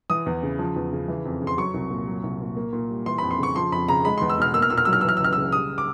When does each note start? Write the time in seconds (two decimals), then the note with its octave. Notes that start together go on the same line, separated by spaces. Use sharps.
0.10 E3 D#6
0.26 E2
0.43 C#3
0.59 F3
0.76 E2
0.93 C#3
1.08 E3
1.25 F2
1.42 C#3
1.47 C6
1.58 F#3 C#6
1.74 C2
1.90 A#2
2.07 F#3
2.24 C2
2.41 A#2
2.56 A#3
2.73 A#2
2.89 G3
3.06 E3 C6
3.18 B5
3.23 F2
3.31 C6
3.39 C#3 C#6
3.56 F3 C6
3.72 F2 B5
3.89 C#3 A#5
4.05 G#3 B5
4.18 C6
4.21 E2
4.30 E6
4.38 B2 F6
4.54 A#3 E6
4.62 F6
4.70 A#2 E6
4.78 F6
4.85 F#3 E6
4.93 F6
5.01 E3 E6
5.09 F6
5.17 E6
5.20 C#2 F6
5.33 C#3 E6
5.52 G3 D#6
5.78 D6